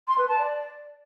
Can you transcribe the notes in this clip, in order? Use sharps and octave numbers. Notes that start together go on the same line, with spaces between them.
C6
B4
A5
D5